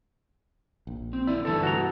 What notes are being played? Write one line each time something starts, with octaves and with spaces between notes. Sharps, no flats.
A#1
C4
D#3 E4 D5
D2 G2 C3 E3 F#3 A4 A5
F#4 A4 A#5